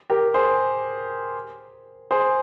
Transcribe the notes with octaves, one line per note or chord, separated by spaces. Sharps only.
G4 A#4
G#4 C5
G#4 C5